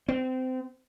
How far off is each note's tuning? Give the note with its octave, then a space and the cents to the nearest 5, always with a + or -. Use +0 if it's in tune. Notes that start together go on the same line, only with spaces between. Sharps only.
C4 -25